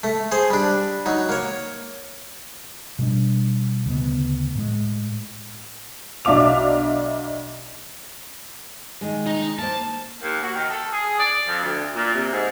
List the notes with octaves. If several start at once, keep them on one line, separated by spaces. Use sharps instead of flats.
A3
G#4 C5
G3 D4
F#3 D#4
A#3 C#5
B2 G3 D4
D2 C#3 G#3 B3
A2 G#3
B1 D4 E5 F5 D6 F7
D#3 G#3
D#4
A#3 C5 A5
D#2
F#4
D#3
A4
G#4
D5
F2
D2
A#2
C3
G#2